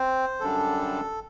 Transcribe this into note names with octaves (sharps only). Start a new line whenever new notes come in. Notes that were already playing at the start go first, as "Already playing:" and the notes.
Already playing: C4 C5
F#2 D3 G3 D4 A4